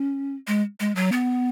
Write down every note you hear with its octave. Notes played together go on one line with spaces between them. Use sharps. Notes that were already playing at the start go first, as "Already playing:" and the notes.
Already playing: C#4
G#3
G#3
F#3
B3